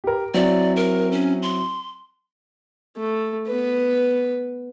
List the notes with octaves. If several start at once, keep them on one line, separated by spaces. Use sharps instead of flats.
G4 A#4
F#3 C4 E4 D5
A#4
C#4
C6
A3
B3 B4